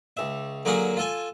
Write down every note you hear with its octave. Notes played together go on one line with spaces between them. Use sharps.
C#2 E5
D3 F#3 A#3 F#4 G#4 A#4
F4 A4 G#5